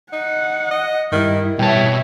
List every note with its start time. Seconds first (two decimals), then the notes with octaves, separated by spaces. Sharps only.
0.13 D#4 F#5
0.71 D#5
1.12 G2 D#3 G3 E4
1.59 B2 E3 G3 C#5 E5 G5 A5